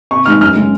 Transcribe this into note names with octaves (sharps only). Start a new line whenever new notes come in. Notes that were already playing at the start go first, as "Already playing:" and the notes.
C3 C#6
D#3 G#3 F6
F#2 F6
C#3 G#3